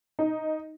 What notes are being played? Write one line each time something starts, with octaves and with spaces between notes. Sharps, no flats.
D#4